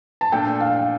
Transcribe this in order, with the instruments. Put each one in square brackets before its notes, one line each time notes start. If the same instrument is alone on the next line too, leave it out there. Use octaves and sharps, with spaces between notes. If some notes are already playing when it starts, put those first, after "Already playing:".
[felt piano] A5
[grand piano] A#2 A3 D4 A4 [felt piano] G5
[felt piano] F5